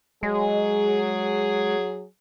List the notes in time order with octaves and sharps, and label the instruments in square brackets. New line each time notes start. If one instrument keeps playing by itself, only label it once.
[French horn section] F#3 G#4 [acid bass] G#3